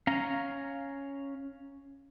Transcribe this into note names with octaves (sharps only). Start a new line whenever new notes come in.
C#4 F5 A#5